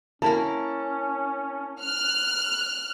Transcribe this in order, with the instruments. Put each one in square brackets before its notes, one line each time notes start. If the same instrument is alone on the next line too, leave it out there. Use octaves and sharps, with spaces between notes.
[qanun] A#3 E4 A#4 [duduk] C#4 [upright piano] A5
[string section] F6 F#6